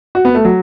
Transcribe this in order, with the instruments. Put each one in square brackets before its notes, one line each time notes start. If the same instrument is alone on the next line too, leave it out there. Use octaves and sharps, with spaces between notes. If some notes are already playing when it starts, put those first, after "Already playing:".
[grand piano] F#4
B3
A3
F#3